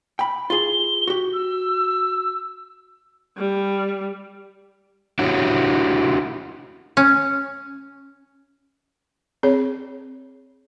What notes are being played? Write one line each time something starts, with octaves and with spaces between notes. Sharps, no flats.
G5 B5
F4 G#4 G7
F#4 G4
E6
G3
D4 E4 F#4 G4 C#5
C#4
C4 G#4 C#5